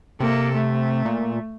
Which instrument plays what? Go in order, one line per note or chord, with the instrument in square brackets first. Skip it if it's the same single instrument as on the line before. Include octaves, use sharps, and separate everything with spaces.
[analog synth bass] C3 [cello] A#3 A4
[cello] A3
[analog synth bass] A#2